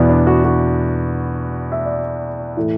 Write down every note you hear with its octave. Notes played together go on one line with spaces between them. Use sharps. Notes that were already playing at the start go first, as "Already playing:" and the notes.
Already playing: E2 B2 B3 D5
D4
F#4
F#4
E5
D5
A2 E3 A3